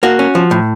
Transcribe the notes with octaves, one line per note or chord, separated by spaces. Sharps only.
A#3 F#4
C#4
F3
A2